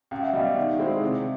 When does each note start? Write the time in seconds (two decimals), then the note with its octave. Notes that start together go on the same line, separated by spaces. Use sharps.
0.11 C#2 F5 G5
0.22 E5 F#5
0.33 B2 G3 D#5 F5
0.45 D5 E5
0.57 D#3
0.79 G#3 C4 E4
1.01 C3